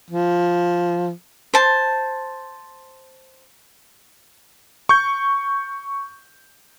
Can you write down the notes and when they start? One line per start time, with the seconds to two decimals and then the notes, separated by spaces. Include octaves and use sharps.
0.10 F3
1.54 C5 A5
4.89 C#6 G6